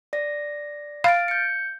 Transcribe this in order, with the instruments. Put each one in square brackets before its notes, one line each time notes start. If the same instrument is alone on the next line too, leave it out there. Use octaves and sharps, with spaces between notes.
[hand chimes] D5 A#6
[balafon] F5 [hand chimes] F6 A6 D7
[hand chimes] G6 C#7